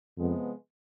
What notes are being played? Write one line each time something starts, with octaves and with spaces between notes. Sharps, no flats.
F2 C3 F3 G#3 B3